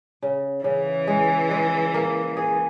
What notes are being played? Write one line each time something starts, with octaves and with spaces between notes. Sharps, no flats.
C#3
C#3 E3
G#3
G#3
A#3
G#4